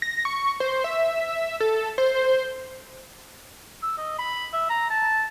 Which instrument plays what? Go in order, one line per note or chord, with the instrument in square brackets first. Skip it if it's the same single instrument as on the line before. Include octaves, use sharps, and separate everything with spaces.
[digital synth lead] A#6
C#6
C5
E5
A4
C5
[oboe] E6
D#5
B5
E5
A#5
A5